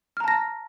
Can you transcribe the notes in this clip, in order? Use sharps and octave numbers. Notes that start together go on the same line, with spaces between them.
A5 A#5 F6 A#6